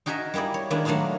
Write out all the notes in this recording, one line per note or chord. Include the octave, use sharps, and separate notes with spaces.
D#4 F#4 G#4 A#4 D#5 E5
G3 A#3 E4 G#4 D5
C#5
D#3 G#3 A#3 D4 E4
F#3 A3 A#3 D4 D#4 F4